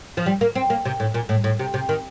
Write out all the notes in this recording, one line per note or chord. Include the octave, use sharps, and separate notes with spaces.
F3
G3
A#3
C4
A#3
C3
A2
A#2
A2
A2
C3
C3
D#3